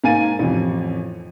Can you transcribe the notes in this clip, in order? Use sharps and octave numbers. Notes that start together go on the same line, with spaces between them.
G#2 A#3 G#5 A6 D#7
A1 F2